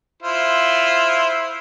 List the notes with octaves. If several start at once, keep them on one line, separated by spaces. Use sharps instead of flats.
E4 F4 C5